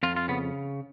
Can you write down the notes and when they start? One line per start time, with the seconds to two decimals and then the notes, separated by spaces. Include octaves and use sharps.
0.03 F2 F4
0.16 F4
0.28 C#3 B3